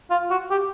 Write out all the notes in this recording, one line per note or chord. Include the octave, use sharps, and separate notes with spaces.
F4
F#4
G4